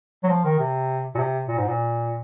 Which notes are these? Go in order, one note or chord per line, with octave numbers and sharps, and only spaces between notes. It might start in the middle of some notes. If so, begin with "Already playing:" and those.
F#3
F3
D#3
C3
A#2
C3
A#2
G#2
A#2